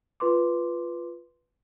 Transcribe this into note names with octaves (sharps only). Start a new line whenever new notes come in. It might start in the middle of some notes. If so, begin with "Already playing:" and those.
F4 B4 C6 D6